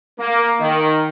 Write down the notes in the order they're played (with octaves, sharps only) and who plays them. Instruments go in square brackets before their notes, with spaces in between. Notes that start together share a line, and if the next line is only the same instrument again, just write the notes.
[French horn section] A#3
D#3